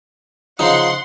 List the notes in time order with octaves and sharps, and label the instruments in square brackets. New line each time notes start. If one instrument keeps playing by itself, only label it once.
[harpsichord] C#3 F3 D#4 [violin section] F#5 C6